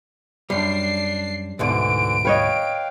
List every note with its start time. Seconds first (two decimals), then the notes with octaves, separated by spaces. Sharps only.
0.50 F#2 G3 D4 C7
1.59 D2 G#2 B2 D3 E3 D7
2.25 B4 C#5 D#5 F5 G5